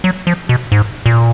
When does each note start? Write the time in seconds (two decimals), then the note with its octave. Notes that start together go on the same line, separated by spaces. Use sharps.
0.04 F#3
0.27 F3
0.49 B2
0.72 G#2
1.06 A#2